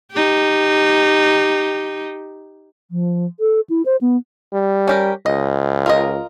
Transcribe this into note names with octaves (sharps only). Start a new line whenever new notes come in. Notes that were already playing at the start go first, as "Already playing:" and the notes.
D#4 G4
F3
A4
E4
C5
B3
G3
C#4 G4 A#4
C#2 D#5
F4 A#4 D#5